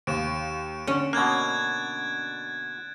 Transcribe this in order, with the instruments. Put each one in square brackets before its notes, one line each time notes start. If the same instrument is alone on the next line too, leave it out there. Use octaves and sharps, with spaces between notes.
[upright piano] D#2 [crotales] D7 E7
[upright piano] D3 [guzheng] C#4
[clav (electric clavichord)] B2 A#3 [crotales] F#6 G#6 A6